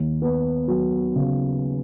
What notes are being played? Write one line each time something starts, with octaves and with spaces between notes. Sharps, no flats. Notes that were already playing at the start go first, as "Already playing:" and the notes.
Already playing: D#2
B3
F#3
C#3